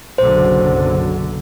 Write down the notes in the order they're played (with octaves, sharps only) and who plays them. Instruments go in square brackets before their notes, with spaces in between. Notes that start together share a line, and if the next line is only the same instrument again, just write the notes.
[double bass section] F#1 F#3 [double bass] B1 D3 [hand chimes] C5